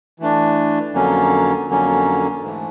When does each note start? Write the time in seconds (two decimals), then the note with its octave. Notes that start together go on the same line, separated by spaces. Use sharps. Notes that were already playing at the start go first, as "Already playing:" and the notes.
0.19 E3 A3 D4
0.93 F2 D3 F#3 A#3 C#4
1.67 F2 D3 F#3 A#3 C#4
2.42 G#2 E3 A3